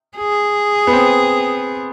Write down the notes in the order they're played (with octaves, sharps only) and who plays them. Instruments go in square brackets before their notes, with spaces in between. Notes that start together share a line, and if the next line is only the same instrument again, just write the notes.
[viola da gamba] G#4
[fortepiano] B3
C4